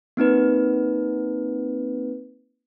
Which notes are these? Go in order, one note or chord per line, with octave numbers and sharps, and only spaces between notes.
A#3 C4 D#4 B4